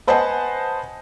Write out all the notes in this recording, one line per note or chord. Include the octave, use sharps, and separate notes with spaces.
B4 C5 D#5 F#5 G#5 A5